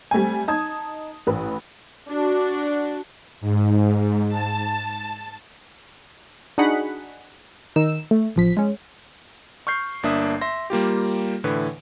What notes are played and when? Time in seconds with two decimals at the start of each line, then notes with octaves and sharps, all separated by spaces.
0.11 G3 A3 C4 G#5
0.48 D#4 A5 D#6 G#6
1.27 A1 B4
2.09 D4 F#4
3.41 G#2
4.29 A5
6.58 D4 D#4 F#4 G#4 F#5 B5
7.76 D#3 D#4 E6 E7
8.11 A3
8.36 A1 F3 B6
8.57 G#3 C#4
9.67 C#6 F6 G6 C7
10.03 G1 A#3 D4 E5 D#6
10.41 E5 C6 A#6
10.70 G3 A#3 F4 G4
11.44 A2 D3 E3 B4